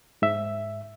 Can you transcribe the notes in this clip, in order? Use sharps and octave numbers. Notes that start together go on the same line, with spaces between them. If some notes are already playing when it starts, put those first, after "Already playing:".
G#2 E5